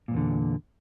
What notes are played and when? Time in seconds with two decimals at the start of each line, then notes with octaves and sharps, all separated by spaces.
0.08 A#2
0.11 G2
0.14 E2
0.17 D3